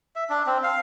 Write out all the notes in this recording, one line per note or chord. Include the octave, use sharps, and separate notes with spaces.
E5
D4
C4
F5